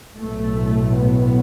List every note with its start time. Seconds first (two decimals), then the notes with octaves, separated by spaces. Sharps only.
0.16 B1 A2 A3
0.94 B3